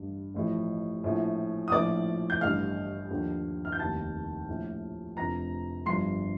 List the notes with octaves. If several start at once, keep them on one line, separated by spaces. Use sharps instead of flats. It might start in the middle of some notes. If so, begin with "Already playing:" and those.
Already playing: A1 G2 D3
A1 A2 F3
A#1 A2 F3
D#6
A#1 A2 F3 D5 D6
G6
A1 G2 D3 F5 F6
D#2 D3 F3
F6
G6
F1 D#2 D#3 A5 A6
A#1 A2 F3
F1 F2 D3 F3 A#5 A#6
G1 G2 D3 F3 C6 C7